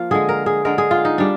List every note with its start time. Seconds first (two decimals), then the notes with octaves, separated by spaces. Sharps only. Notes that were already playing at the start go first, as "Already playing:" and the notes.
Already playing: F3 A#3 F4
0.11 D3 G#3 G#4
0.29 A#4
0.46 G#4
0.65 D3 G#3 A#4
0.78 G#4
0.91 F4
1.05 D#4
1.18 G3 D4